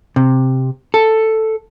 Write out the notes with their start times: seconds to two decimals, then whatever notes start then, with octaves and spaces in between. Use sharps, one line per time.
0.16 C3
0.94 A4